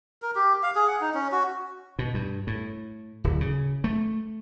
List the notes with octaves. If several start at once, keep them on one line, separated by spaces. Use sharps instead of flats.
A#4
G4
F5
G#4
F#5
D#4
C#4
F#4
B2
G2
A2
D1
C#3
A3